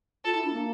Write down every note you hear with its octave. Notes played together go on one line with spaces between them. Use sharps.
F4 A4
E4
D4
A#3